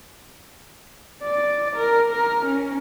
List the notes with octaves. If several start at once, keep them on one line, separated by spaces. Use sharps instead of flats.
D5
A#4
A#4
C#4